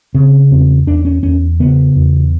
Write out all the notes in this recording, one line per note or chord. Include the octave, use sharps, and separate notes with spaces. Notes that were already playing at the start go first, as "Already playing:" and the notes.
C#3 C4
E2 C4
E2 D4
C#4
E2 C#4
C#3 B3
E2